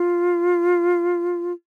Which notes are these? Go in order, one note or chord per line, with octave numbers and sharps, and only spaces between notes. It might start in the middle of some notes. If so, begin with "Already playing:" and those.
Already playing: F4